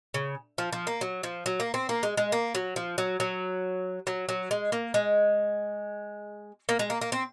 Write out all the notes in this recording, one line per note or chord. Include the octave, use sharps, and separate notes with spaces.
C#3
F3
F3
A#3
F#3
F3
F#3
A#3
C4
A#3
G#3
G#3
A#3
F#3
F3
F#3
F#3
F#3
F#3
G#3
A#3
G#3
A#3
G#3
A#3
A#3
C4